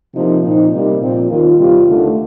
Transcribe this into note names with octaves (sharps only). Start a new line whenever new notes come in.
C3 F3 A#3 D#4
A#2 F3 C4 D#4
C3 G3 A#3 D#4
A#2 F3 C4 F4
D#2 D#3 A#3 F4
C3 G3 C4 F4
D#2 D3 A3